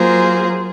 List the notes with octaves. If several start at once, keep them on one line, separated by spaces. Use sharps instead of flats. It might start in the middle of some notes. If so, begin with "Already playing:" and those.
Already playing: F#3 A#3 F4 G#4 C5